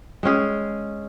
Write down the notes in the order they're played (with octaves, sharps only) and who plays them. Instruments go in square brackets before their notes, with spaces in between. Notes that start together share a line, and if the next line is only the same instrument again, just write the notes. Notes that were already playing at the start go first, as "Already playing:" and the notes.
[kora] G#3 C#4 G#4